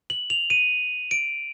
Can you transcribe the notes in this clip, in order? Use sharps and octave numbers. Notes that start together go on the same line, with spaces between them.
F#7
F7
D#7
D7